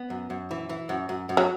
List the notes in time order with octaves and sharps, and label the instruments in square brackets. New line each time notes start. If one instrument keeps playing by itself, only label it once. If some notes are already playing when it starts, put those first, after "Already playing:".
Already playing: [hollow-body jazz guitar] B3
F#2
F#2
E3
E3
F#2
F#2
F#2
[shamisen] F#3